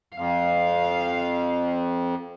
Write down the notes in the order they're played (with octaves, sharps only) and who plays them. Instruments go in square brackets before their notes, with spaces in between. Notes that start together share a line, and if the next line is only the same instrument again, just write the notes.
[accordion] F2 [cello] F5